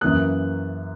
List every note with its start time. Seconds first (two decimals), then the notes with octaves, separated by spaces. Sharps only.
0.01 F#2 E3 A#3 D#6 F#6